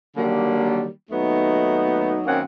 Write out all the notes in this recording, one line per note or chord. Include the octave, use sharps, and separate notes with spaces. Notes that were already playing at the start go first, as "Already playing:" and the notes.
D3 D#3 F#3 G3 A#3
D#2 F#3 A3 B3 D#4
F#2 D#3 A#3 C4 C#4 F#5